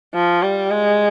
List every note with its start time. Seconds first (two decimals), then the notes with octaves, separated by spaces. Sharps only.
0.14 F3
0.42 G3
0.70 G#3